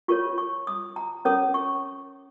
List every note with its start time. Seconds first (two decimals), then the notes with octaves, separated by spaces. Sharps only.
0.08 F4 A#4 C#5 C#6
0.38 C#6
0.67 D#6
0.96 A#5
1.25 C#4 A#4 C#5 D#6
1.54 C#6